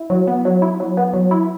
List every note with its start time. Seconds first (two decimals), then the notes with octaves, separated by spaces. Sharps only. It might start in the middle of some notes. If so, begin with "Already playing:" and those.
Already playing: E4
0.10 F#3
0.27 B3
0.45 F#3
0.62 E4
0.80 F#3
0.97 B3
1.13 F#3
1.31 E4